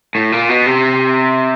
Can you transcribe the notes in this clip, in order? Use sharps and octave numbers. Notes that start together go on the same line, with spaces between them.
A2
A#2
B2
C3